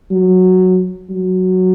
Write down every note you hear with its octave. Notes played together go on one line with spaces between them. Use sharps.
F#3
F#3